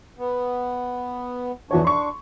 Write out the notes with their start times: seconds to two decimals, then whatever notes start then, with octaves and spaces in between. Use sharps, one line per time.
0.19 B3
1.71 E2 E3 F3 D4 F#4 C#5
1.85 D4 C6 C#6